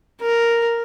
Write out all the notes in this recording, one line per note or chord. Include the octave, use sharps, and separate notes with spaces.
A#4